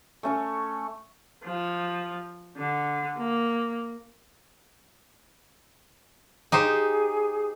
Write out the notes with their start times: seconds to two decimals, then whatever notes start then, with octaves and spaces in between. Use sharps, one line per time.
0.23 A3 C#4 C#6
1.44 F3
2.57 D3
3.18 A#3
6.52 D#4 G4 G#4 C5